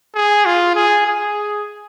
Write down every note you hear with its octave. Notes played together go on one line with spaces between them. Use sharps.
G#4
F4
G#4
G#4